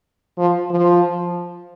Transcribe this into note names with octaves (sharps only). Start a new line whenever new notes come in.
F3
F3